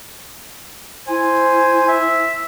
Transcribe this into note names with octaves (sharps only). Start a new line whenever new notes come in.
E4 C5 G#5
E5